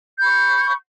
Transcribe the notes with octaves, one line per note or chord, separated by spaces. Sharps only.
B5 C#6 G6